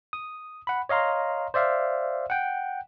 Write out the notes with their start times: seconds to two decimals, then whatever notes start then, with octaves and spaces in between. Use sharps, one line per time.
0.13 D#6
0.67 F#5 B5
0.89 C#5 D#5 F5 A#5 C6
1.54 C5 D5 E5 F5
2.30 F#5 G5